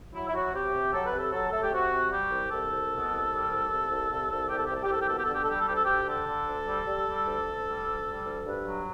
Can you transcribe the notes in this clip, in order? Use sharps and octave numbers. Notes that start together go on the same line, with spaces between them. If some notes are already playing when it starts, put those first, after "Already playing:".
F#3 E4
E4
F#3 F#4
C3 G4
C3
F#3 A4
B4
C3
A4
F#3 A4
A3 A4
G4
C3 F#4
C3
G3 G4
C2
C2 A4
C2
B2
C2
G3
C2
C2
C2
C2
C2
C2 G4
A4
C2 G4
A4
G4
C2 A4
G4
B2 A4
G4
A4
D3
G4
A4
G3 G4
A4
D2 G4
A4
D2 G4
D3 A4
D3
D2
G3
G3
G3
D2
D2
G3
D2
G3
D2
G2 B4
F#3